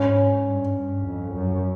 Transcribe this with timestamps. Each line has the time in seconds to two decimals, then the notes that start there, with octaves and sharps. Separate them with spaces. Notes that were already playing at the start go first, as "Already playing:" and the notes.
Already playing: G#2 C#4
0.47 G2
0.77 G2
1.07 F2
1.35 F#2